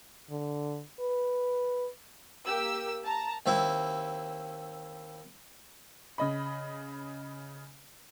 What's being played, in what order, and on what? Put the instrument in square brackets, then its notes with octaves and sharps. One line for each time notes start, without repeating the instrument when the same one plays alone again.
[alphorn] D3
B4
[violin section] A#3 G4 E6
A5 A#5
[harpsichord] D#2 C4 E4
[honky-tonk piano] C#3 D#5 B5